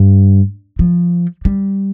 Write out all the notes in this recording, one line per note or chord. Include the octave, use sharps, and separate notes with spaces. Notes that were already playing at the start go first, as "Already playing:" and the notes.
Already playing: G2
F3
G3